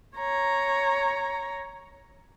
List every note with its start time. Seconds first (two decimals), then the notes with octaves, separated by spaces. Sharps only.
0.17 C#5 A#5